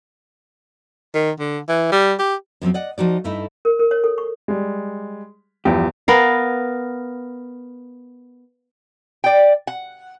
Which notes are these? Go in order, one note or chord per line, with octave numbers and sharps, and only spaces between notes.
D#3
D3
E3
G3
G4
F#2 F3 F#3 C4
D5 D#5 F#5
F3 D#4 F#4 D5
G2 A3 D#4 E4
A#4
A#4
C#5
A4
C#6
G3 G#3
E2 G2 E3 F3 G4
B3 A#4 F5
D5 G5
F#5